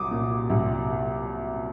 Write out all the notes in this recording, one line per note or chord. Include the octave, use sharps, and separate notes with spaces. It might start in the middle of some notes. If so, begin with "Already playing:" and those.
Already playing: C2 F#3 D6 D#6
A#2
C2